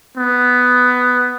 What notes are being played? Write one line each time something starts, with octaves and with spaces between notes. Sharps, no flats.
B3